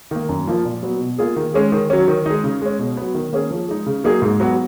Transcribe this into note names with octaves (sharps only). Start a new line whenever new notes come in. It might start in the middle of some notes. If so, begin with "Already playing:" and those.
D#3 A#3
F#2
F3 A#3 F4
A#2
F#3 B3
B2
A#3 F4 G#4
D#3
G#3 C#4 G#4
D#3
F#3 C#4
D#3
G#3 D#4
C#3
G#3 C#4
B2
F#3 B3
D#3
A#3 C#4 G#4
F3
G#3 D#4
C#3
F#3 A#3 D#4 G#4
G#2
F#3 B3 F#4